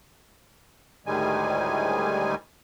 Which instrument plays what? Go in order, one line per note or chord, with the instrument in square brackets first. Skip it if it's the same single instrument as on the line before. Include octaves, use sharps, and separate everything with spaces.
[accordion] D2 A2 D#3 G3 G#3 G#5